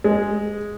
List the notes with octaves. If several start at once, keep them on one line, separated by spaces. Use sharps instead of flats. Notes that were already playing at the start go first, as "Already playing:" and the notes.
G#3